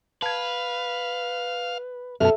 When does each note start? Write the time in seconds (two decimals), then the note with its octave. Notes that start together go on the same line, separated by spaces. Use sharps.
0.22 B4 F5 A5 G#6
2.20 F#2 B2 A4 E5 A5 F6